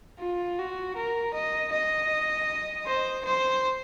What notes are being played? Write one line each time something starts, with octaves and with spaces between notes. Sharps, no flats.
F4
F#4
A#4
D#5
D#5
C5
C5